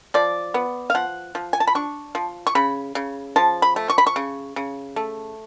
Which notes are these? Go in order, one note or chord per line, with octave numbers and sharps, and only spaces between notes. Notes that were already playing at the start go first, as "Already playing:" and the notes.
F3 D5
B3
F5
F3 F#5
F3
G#5
A5
B5
D4 C#6
F3
C#6
C#3 B5
C#3
F3 A5
B5
A3
C#6
B5
C#6
C#3
C#3
A3